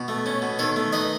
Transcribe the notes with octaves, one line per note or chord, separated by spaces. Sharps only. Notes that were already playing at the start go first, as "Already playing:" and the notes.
Already playing: B2
A3
C#4
B2
D#3 A4 C#5
A3
D#4 B4 D#5